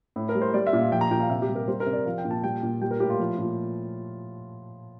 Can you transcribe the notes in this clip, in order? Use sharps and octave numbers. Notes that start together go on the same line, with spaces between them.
A2
A#4
G3
C5
G3 D5
E5
A#2
F5
F3 G5
A#5
A#2 G5
F5
C3 E5
G4
G3
A#4
G3 C5
A#4
C3
D5
F3 F5
G5
A#2
A5
G3 G5
A#2
G3 G5
A#4
A2 G4
F4
F3
A#2